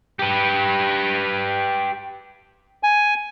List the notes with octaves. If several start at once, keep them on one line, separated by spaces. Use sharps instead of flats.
G4 B4
G#5